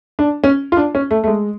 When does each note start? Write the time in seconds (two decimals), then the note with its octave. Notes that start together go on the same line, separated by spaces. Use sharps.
0.19 D4
0.44 C#4
0.72 F4
0.77 D4
0.95 C#4
1.11 A3
1.24 A3
1.27 G#3